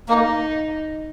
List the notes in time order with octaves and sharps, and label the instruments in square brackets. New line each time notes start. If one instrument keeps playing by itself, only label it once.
[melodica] A#3 [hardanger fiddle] D#4